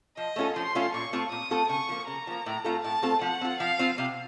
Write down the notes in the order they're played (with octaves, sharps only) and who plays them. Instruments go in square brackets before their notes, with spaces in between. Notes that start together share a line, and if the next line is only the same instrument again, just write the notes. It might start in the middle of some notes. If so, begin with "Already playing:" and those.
[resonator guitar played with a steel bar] F3 [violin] D#5
[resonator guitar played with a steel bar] A3 C#4 F4 A4
[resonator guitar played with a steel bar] F3 [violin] C6
[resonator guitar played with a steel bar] A3 C#4 F4 A4
[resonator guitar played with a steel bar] A#2 [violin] C#6
[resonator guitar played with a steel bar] A3 C4 F4 A4
[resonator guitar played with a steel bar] A#2 [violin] D#6
[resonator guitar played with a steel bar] A3 C4 F4 A4
[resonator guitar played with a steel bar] C#3 [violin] C#6
[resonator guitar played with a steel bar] F3 A#3
[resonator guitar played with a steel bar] C#3 [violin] A#5
[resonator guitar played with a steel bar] F3 A#3
A2
A3 C4 F4 A4
[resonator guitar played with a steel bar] A2 [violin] A5
[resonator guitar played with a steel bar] A3 C4 F4 A4
[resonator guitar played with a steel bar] F3 [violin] F#5
[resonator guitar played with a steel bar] C4 F4
[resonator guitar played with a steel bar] F3 [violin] F5
[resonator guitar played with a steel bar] C4 F4
C3